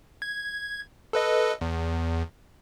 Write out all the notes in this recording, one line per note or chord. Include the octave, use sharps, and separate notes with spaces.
G#6
A4 B4 D#5
E2